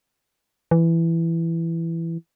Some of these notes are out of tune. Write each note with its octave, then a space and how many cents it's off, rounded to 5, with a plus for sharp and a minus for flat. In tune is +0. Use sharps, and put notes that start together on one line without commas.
E3 +10